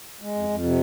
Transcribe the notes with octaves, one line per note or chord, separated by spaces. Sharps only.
G#3
F2
F2
C3